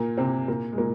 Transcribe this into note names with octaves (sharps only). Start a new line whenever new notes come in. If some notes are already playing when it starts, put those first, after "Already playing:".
Already playing: A#2 A#3
C3 C4
A#2 A#3
G#3
A#2 A#3